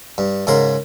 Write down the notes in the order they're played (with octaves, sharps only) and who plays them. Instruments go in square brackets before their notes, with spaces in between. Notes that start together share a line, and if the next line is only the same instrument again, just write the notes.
[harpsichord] G2
G#2 C#3 A#4 C6